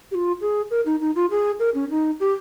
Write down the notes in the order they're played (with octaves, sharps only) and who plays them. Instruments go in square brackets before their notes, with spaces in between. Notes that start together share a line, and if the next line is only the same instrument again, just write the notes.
[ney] G4
F4
G#4
A#4
D#4
D#4
F4
G#4
A#4
C#4
D#4
G4